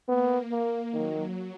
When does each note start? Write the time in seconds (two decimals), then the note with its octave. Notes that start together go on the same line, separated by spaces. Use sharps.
0.08 A#3 B3
0.51 A#3
0.94 D#3 F#3